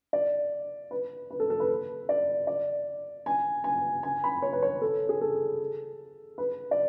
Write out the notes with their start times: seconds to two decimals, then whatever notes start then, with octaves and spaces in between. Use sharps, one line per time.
0.13 D5
0.91 B4
1.31 B4
1.40 A4
1.50 A4
1.60 B4
2.09 D5
2.47 D5
3.26 G#5
3.64 G#5
4.03 G#5
4.24 B5
4.42 C#5
4.53 B4
4.62 C#5
4.82 A4
5.09 G#4
5.21 A4
6.38 B4
6.71 D5